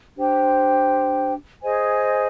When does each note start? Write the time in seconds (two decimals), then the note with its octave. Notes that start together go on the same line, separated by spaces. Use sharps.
0.15 D4 G4 C5 G5
1.61 G#4 C5 D#5 G#5